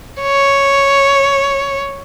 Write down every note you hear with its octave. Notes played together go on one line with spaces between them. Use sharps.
C#5